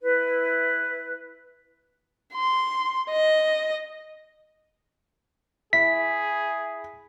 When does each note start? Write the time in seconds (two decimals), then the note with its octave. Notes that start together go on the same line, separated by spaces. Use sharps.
0.03 E4 B4
2.33 C6
3.10 D#5
5.73 E4 G#4 B6